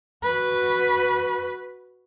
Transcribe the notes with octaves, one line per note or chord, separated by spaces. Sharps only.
F#4 B4